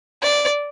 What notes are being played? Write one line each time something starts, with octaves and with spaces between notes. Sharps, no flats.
D5